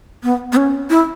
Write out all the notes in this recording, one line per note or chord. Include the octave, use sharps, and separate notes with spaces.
B3
B3
C#4
E4